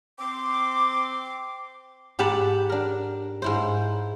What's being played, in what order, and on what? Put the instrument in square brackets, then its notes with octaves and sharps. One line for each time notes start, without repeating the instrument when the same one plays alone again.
[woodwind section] C4 C6 D6
[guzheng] G#2 G4 F#5 A5 B5
D4 A#4
G#2 E4 C5